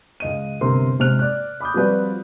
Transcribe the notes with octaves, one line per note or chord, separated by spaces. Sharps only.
C#2 D#5 D#7
G1 C3 C4 A#4 C6
G#2 C3 C5 F6 F#6 F7
D5 F#6
B5 D6 D#6 G6
F3 G3 C4 F#4 B4 D5